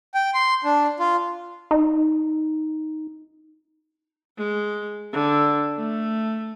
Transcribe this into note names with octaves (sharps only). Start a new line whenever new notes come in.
G5
C6
D4
F4
D#4
G#3
D3
A3